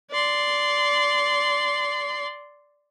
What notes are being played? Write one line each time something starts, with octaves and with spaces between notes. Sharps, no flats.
D5 C6